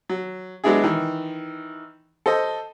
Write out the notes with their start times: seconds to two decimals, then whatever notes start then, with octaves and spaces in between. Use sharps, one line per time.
0.09 F#3
0.64 F#3 G#3 B3 D4 E4 G#4
0.83 D#3 E3
2.26 A4 C5 D#5